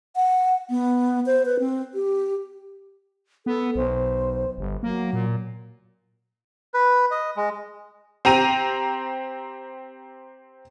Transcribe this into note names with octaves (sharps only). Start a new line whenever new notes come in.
F#5
B3
C5
B4
C4
G4
B3 A4
B1 C5
G1
F#3 A#3
A#2
B4
D#5
G#3
C4 G4 A#5 D#7